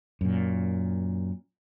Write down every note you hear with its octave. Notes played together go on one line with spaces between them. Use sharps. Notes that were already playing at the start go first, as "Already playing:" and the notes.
F#2 A#2